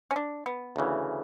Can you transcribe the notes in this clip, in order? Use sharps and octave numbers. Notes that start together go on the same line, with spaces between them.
C#4
D4
B3
D2 C#3 E3